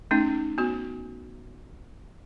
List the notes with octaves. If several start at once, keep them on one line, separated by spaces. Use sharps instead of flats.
A3 C#4 D#4
B3 F#4